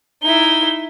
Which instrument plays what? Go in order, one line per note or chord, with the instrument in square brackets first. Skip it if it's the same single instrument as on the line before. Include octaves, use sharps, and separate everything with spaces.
[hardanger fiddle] D#4 E4 [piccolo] G7